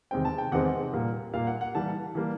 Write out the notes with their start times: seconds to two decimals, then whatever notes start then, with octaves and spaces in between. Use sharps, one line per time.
0.11 E2 C3 D#3 G#3 C4 G5
0.25 A5
0.38 G5
0.52 E2 C3 D#3 G#3 C4 F#5
0.93 A#2 G3 A#3
1.34 A#2 G3 A#3 F5
1.47 F#5
1.61 F#5
1.75 E3 G3 A#3 A5
2.15 E3 G3 A#3